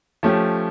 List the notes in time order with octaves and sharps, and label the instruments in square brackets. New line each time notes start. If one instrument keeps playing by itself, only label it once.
[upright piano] F3 A3 C#4 G4